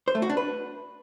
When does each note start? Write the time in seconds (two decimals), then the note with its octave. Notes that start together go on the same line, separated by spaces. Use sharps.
0.08 C5
0.15 A3
0.22 F#4
0.30 D4
0.37 B4